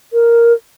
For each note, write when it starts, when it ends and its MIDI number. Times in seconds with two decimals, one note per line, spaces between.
0.13 0.53 70